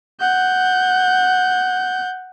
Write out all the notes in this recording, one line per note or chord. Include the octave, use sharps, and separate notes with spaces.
F#5 G6